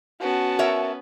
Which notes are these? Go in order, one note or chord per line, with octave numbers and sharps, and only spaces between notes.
B3 C#4 F#4 A5
A#4 C#5 E5